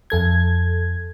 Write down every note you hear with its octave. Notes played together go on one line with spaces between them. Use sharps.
F2 A4 G#6